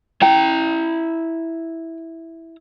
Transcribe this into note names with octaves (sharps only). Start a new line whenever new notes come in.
E4 G5 A#5